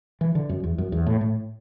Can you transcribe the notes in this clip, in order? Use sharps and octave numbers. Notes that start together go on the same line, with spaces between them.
E3
D3
F#2
E2
F#2
E2
A2
A2